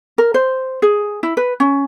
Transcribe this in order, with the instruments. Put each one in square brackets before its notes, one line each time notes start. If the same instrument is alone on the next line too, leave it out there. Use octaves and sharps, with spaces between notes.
[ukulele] A#4
C5
G#4
E4
B4
C#4